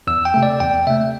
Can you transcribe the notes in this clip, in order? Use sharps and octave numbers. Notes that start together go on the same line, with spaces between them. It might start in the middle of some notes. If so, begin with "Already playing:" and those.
E2 E6
G5
C3 A3
D5
E2 G5
C3 A3 E5